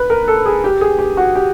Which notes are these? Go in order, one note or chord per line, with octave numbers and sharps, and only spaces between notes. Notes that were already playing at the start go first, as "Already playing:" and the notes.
Already playing: B4
A#4
A4
G#4
G4
G#4
G4
F#4
G4